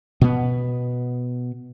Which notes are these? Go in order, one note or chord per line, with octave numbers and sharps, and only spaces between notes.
B2 B3